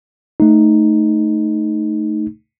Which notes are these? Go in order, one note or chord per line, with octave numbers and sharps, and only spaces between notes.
A3 D#4